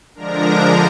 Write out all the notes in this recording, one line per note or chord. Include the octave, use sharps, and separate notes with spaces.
D3 F3 G#3 D4 A#4 A#5